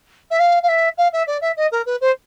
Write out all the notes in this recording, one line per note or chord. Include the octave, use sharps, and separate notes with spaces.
E5
F5
F5
E5
F5
E5
D5
E5
D#5
A#4
B4
C5